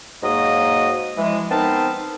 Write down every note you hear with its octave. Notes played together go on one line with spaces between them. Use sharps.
G#2 F#3 A#3 F#4 D#5 D#6
E3 F3 G#3
B3 C4 D#4 A#4 A5